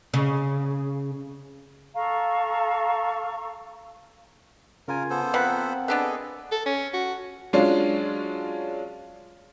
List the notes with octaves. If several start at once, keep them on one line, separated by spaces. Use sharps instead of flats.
C#3
A4 F5 A#5 C#6
C#3 F4 A#4 G#5
B3 A4 C5
F3 C4 A#4 B4 F#5 B5
B3 D4 G#4 A4 B4 D#5
A4
C#4
F#4
F#3 G#3 C#4 D4 F4